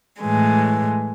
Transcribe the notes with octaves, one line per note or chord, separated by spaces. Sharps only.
A2 E3 G#3